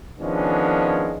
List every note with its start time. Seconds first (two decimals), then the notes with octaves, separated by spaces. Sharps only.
0.19 D#3 F3 G#3 B3 C#4 D4